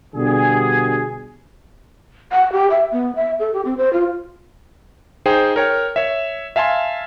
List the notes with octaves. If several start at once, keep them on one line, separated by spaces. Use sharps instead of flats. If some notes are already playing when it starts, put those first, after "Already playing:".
B2 D3 G3 G#4
F#5
G4
E5
B3
E5
A4
G4
C4
C5
F4
D#4 G#4 C5 G5
A#4 C#5 G5
C#5 E5
E5 F5 G#5 A5 C6